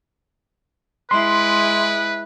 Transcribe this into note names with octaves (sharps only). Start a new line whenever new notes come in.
G#3 E4 B4 C6